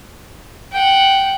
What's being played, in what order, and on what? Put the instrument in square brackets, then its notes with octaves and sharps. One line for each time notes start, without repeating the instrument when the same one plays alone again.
[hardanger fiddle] F#5 G5